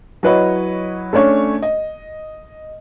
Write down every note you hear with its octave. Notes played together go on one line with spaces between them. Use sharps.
F#3 E4 B4 C#5 D#5
A3 C#4 D4 C#5
D#5